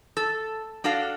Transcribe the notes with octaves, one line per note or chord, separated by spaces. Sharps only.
A4
D4 F#4 A4 F5